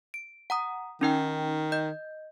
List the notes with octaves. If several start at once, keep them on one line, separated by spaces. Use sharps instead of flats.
D7
F#5 A#5 D#6
D#3 C#4 D#4 G5
D#5 G6